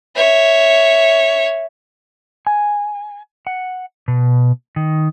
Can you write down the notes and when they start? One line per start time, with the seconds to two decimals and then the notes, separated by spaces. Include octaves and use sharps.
0.16 C#5 E5
2.47 G#5
3.47 F#5
4.08 B2
4.76 D#3